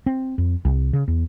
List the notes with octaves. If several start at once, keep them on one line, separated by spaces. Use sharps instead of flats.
C4
F2
C2
C#3
E2